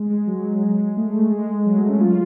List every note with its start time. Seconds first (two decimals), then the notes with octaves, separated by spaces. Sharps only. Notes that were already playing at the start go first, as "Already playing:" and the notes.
Already playing: G#3
0.10 G#3
0.27 F#3
0.62 G#3
0.97 A3
1.31 G#3
1.66 F#3
1.77 A3
1.89 C#4
2.00 F4